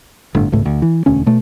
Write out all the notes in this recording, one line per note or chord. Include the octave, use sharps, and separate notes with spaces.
G1 A2 D3
G#1 C#2 A2
D2
E3
E1 D2 C#4
B2 A3